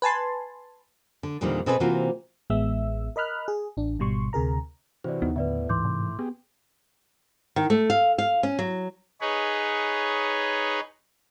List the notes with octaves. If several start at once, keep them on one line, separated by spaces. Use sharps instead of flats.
B4 G#5 A5 C6
D3
E2 A#2 D3 D#3 G3 C4
B2 C4 G#4 A4 B4
C3 E3 A#3 C4 F4 F#4
A1 G#3 B3 E5 E6
A#4 D#5 B5 F6 F#6
G#4
A1 D4
G#1 B2 G3 C6 C#6
D2 C3 G#4 A#4 A#5
C3 E3 F#4 C5 D5
D#2 B3 D#4
A2 D3 B4 D5 E5
D2 G#2 E3 C6 D6 G6
C3
B3 G4 G#4
D#3
A3
F5
F5
C#4
F#3
D#4 G#4 B4 C#5